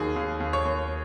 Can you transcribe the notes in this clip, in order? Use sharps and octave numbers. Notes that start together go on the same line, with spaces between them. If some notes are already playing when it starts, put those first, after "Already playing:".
Already playing: D#2 D#3 F#3 G#4
D#2
D#2
C#5
D#2